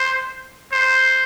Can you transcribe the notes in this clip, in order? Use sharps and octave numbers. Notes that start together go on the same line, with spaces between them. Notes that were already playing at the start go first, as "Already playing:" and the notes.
Already playing: C5
C5